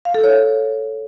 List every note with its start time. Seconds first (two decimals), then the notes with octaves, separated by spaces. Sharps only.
0.05 F5
0.14 A4
0.24 C#5